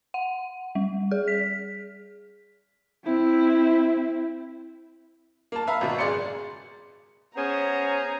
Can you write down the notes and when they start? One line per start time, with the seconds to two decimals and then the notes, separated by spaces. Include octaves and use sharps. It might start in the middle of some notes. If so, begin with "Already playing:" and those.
0.14 F#5
0.75 G3
1.11 G#4
1.28 B6
3.05 C4 E4
5.52 A#3 A5
5.67 B4 E5 F5 A#5
5.81 G#1 B2
5.99 F#1 G#4 D5 C6 C#7
7.36 B3 C#4 G#4 C5 C#5 A#5